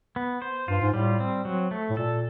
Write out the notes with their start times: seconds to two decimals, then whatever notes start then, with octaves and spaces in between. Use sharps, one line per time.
0.16 B3
0.42 C5
0.68 G2 F4
0.81 G#2
0.93 A2 G3
1.20 C4
1.45 F#3
1.71 A3
1.90 A2
1.97 A#2 A4